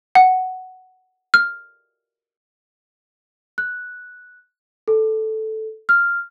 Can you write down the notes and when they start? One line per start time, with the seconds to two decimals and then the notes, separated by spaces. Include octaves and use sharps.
0.15 F#5
1.34 F6
3.58 F#6
4.88 A4
5.89 F6